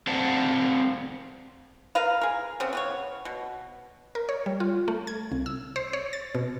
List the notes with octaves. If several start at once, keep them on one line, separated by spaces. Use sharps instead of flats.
C4 C5 D5 F5 F#5 A5
A#4 B4 F5
G#4 A#4
C#3 B3 C4
B3 G4 C#5
B2
A#4
C#5
G3
F4
A3
G#6
C2
E6
C5
C#5
A6
B2